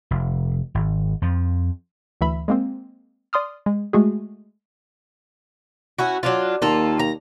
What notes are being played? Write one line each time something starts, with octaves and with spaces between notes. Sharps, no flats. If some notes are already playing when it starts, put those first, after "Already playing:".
F1
G#1
F2 F3
D2 E3 E5 B5
G#3 A#3 C4
D5 C6 D#6 F6
G#3
G#3 A3 F#4 G#4
C#4 E4 F#4
F#3 D4 F4
D#2 A#3 F4 A4
A#5